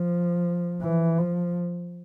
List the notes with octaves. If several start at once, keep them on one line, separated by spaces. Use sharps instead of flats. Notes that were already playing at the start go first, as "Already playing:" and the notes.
Already playing: F3
E3
F3